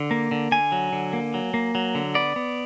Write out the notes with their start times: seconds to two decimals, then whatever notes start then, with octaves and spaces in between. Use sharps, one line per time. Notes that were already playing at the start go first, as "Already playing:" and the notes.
Already playing: D3
0.11 A#3
0.31 D3
0.52 D3 G#5
0.72 F#3
0.93 D3
1.13 A#3
1.34 F#3
1.54 A#3
1.75 F#3
1.95 D3
2.15 B3 D5
2.36 B3